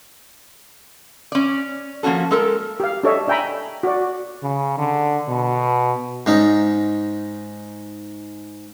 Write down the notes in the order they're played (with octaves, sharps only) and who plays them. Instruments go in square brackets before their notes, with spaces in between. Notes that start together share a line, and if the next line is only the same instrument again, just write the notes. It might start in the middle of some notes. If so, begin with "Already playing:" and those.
[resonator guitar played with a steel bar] C#4 D5
F3 A#3 C#4 F#4 A4
G#3 A4 A#4
[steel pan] G4 F5
D4 G4 A4 C#5 D#5 E5
D4 E5 G5 G#5 A#5 B5
F#4 D5
[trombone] C#3
D3
B2
[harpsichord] G#2 C#4 D#4